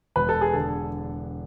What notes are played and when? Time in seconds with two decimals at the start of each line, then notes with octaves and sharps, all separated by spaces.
0.16 E1 B4
0.29 A4
0.41 G#4
0.53 D3 A4